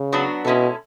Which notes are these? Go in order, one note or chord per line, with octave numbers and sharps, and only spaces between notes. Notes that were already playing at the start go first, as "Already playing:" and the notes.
Already playing: C#3
F#3 B3 D4 F#4
B2 G#3 C#4 E4 A4